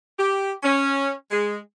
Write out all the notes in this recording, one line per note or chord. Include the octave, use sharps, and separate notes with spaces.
G4
C#4
G#3